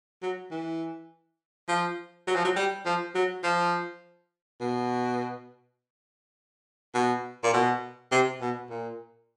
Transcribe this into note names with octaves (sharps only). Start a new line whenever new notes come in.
F#3
E3
F3
F#3
F3
F#3
G3
F3
F#3
F3
B2
B2
A#2
B2
C3
B2
A#2